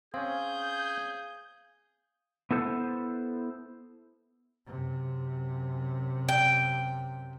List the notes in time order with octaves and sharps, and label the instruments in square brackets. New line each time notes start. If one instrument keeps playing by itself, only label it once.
[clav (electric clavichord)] C4 C#4 [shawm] G#4 [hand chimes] F5 [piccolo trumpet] G6
[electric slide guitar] B3 E4 A4 C5
[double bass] F#2 C3
[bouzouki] G5